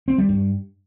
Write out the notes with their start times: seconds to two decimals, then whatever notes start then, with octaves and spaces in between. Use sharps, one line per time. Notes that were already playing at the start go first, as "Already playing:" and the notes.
0.08 C4
0.18 G3
0.29 G2